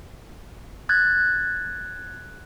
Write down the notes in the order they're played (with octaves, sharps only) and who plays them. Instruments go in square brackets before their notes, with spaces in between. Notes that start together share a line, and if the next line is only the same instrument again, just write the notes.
[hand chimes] F#6 G#6 A6